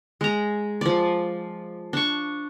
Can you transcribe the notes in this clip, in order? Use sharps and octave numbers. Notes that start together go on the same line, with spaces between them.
G#3 A#5
F3 D5
D4 C#6